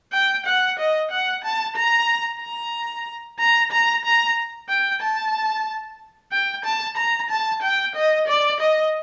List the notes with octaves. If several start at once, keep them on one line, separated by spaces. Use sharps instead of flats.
G5
F#5
D#5
F#5
A5
A#5
A#5
A#5
A#5
A#5
G5
A5
G5
A5
A#5
A5
G5
D#5
D5
D#5